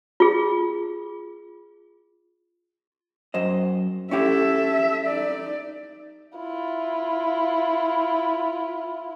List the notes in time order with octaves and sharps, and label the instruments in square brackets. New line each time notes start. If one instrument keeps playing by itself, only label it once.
[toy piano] F4 G#4
[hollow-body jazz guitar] F#2 C5 D#5
[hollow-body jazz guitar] C#4 E4 G4 [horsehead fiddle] A4 E5
[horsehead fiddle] D#4 D5
[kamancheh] E4 F4